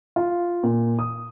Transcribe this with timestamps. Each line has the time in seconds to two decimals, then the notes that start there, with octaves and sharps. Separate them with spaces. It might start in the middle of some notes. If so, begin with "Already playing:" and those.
0.16 F4
0.63 A#2
0.99 D#6